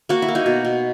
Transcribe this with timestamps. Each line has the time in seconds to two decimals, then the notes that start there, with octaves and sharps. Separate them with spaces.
0.09 A#3 F#4
0.22 E4
0.28 A#3
0.35 D#4 F#4
0.46 B2
0.65 B2